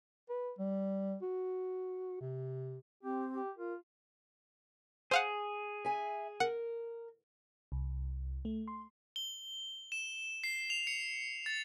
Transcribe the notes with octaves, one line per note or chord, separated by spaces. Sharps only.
B4
G3
F#4
C3
C4 G4
G4
F4 A#4
G#4 C5 F5 F#5
E5 G#5
A#4 F#5
C2
A3
C6
G7
E7
C7
F7
C#7
A6